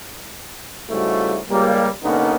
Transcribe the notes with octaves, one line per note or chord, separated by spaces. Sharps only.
G#2 C#3 G3 A3 E4 F#4
C#2 G3 A#3
G2 D3 A#3 B3 C#4 D#4